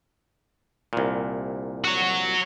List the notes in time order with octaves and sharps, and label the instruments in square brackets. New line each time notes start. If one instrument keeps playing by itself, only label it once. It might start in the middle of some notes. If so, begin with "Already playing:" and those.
[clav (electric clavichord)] C2 A#2
[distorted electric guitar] F#4 C#5